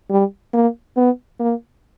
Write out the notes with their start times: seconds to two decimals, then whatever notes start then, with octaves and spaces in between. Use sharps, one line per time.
0.10 G3
0.54 A#3
0.97 B3
1.40 A#3